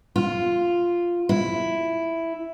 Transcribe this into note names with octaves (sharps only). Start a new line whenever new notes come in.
F4
E4